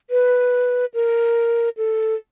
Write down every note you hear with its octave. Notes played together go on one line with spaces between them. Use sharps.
B4
A#4
A4